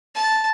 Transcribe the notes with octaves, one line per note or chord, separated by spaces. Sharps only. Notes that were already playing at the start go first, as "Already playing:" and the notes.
A5